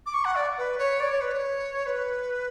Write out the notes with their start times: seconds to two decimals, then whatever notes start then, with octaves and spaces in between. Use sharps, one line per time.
0.06 D6
0.14 C#6
0.25 F#5
0.35 D5
0.58 B4
0.78 C#5
1.00 D5
1.10 C#5
1.21 B4
1.32 C#5
1.86 B4